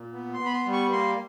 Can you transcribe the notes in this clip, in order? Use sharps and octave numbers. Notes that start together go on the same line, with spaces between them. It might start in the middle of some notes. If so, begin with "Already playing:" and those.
Already playing: A#2
B3
C6
B3
B5
C6
G3
C#6
A#3 C6